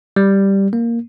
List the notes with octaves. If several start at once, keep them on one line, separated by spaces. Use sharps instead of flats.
G3
A#3